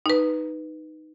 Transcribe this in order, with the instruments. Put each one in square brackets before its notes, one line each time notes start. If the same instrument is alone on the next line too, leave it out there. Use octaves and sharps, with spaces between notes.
[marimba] D#4 B4